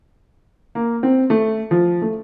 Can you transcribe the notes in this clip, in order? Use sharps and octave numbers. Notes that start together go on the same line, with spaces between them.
A#3
C4
A3
F3
A3